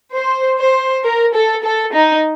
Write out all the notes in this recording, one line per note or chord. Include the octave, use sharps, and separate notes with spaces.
C5
C5
A#4
A4
A4
D#4